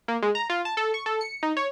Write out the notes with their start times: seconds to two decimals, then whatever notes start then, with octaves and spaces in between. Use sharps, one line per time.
0.08 A#3
0.22 G#3
0.35 A#5
0.50 F4
0.65 A5
0.77 A4
0.94 C#6
1.06 A4
1.21 C#7
1.43 D#4
1.57 C#5